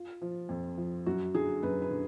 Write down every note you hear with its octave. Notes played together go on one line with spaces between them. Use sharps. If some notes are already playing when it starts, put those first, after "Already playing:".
Already playing: F4
F3
F2
F3
F#2 F#4
D3 F#3 G#4
F#2 B4
B4
D3